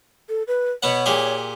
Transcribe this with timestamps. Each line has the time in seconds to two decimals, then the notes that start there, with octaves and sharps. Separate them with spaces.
0.29 A4
0.47 B4
0.83 B2 B3 C#5 F#5
1.06 A#2 G4 G#4